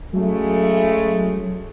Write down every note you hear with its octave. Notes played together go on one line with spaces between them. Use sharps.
C#3 F#3 G#3 A3